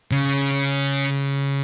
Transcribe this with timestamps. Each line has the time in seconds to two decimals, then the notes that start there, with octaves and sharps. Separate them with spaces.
0.11 C#3